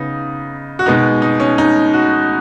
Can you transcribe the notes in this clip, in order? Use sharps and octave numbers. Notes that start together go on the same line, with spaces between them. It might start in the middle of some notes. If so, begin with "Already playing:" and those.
Already playing: C#3 B3 D#4
F#4
B2 G#3 B3 D#4
D#4
C#4
D#4
F#4